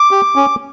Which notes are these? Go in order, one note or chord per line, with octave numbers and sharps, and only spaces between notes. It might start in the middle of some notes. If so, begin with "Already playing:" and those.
Already playing: D6
G4
C#4